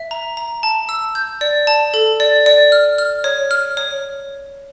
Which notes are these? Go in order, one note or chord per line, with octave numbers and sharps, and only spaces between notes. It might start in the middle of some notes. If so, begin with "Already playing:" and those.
Already playing: E5
A#5
A#5
A5
E6
G6
D5
A5
A4
D5
D5
F6
F6
C#5
F6
C#5